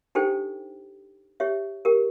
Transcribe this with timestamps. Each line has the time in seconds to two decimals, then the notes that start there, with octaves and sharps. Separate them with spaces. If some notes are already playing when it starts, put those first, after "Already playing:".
0.15 D4 D#4 G4 A4 C5 G5
1.40 G4 C#5 E5
1.85 G4 A#4